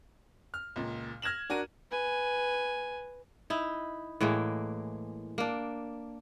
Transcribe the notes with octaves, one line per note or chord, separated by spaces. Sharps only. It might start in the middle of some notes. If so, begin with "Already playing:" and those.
F6
C#2 A#2
F6 G#6 A#6 E7 F#7
D4 F#4 A#4 D#7
B4 G#5
D#4 E4
A2 E3 G#3 A#3
A#3 D4